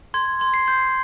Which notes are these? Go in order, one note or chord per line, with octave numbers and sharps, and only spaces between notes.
C6 G#6
C6
C7
G6